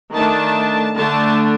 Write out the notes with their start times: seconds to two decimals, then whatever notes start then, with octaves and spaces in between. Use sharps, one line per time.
0.13 D#3 A3 D4 A5
0.97 D3 A3 D4 A5